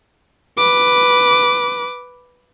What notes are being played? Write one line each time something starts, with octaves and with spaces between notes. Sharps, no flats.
B4 D6